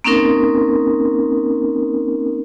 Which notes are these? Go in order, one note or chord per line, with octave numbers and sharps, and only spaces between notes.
A#3 C4 C#4 D#4 A#4